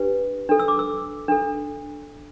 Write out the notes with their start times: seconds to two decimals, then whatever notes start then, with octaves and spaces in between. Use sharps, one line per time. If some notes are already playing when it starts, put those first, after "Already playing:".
Already playing: D4 G4 B4
0.49 D4 A4
0.59 E6
0.68 D6
0.79 E6
1.28 D4 A4